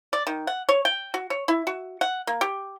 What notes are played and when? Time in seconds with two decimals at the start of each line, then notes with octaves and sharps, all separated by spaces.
0.13 D5
0.27 D#3
0.47 F#5
0.69 C#5
0.85 G5
1.14 F#4
1.30 C#5
1.48 E4
1.67 F#4
2.01 F#5
2.27 A#3
2.41 G4